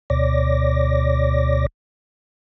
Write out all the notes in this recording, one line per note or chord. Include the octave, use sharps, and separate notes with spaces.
D2 B2 C#5 D5 D6 A#6